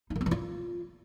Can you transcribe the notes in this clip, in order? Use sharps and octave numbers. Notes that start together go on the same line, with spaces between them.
D#4
D#3
C4
E3
F4